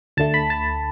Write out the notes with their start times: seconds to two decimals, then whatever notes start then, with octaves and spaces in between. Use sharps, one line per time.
0.17 D2 D3 A3 A5
0.34 B5
0.50 A5